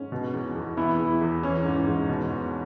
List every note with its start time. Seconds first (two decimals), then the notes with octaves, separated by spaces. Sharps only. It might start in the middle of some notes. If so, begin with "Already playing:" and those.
Already playing: G#2 C#4
0.12 B2
0.33 E2
0.56 E2
0.77 E3 B3 E4
0.99 E2
1.21 E2
1.43 E3 C#4
1.65 G#2
1.87 G#2
2.09 B2
2.31 E2